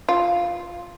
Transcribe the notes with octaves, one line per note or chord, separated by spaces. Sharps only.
F4